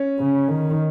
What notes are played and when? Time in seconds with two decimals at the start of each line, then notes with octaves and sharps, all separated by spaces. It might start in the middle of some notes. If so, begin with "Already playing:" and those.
Already playing: C#4
0.19 C#3
0.48 D#3